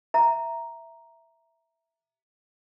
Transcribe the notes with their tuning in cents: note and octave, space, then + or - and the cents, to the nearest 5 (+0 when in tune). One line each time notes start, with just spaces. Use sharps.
E5 +0 A#5 +0